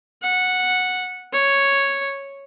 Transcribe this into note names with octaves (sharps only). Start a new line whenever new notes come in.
F#5
C#5